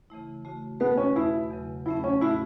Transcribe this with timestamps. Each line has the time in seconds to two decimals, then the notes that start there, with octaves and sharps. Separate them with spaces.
0.10 C#3 E3 A3 E4
0.45 C#3 A3 F#4
0.80 B2 A3 B3 F#4 B4
0.97 C#4
1.15 E2 B2 A3 E4 F#4
1.51 E2 C#3 F#3
1.86 F#3 A3 C#4 E4
2.04 C#4
2.21 A2 A3 E4 F#4